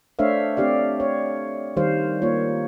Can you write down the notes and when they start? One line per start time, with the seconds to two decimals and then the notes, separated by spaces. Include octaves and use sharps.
0.19 A3 D4 C5 C#5 E5 F5
0.57 A3 C4 D4 G4 D5 F5
1.00 C#5
1.77 D#3 G3 C5 F5
2.22 A#3 F4 C#5